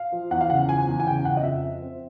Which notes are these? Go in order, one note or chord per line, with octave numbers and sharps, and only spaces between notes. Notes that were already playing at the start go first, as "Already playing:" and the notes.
Already playing: F5
F3
E2 F#5
F5
C#3 F#5
F3 G#5
E2
G#5
C#3 G5
C#3 F#5
D#5
F2 E5
F3
C4